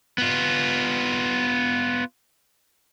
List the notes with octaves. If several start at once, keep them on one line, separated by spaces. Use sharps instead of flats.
B3 F4